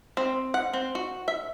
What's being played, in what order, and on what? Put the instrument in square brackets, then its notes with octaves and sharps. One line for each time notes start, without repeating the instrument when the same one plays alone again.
[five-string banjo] C4
F#5
C4
F#4
E5